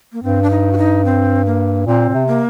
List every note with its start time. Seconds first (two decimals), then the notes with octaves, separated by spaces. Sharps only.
0.13 A#3
0.23 G2 C4
0.43 D4
0.50 D#4
0.73 F#4
0.77 D#4
1.05 C4
1.46 A#3
1.86 A#2 C4
2.09 A#2
2.14 C3
2.28 A#3